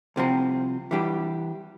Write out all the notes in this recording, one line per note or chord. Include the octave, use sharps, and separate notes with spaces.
C2 C3 F3 C4
E3 G3 D4 G4